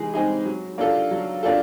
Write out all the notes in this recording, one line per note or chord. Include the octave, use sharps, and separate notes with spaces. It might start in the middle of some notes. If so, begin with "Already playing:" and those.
Already playing: E3 G#3 D#4 G#4
G#3 C4 D#4 G#4
F#3
A#3 D4 F4 A4
F#3
A#3 D4 F4 A4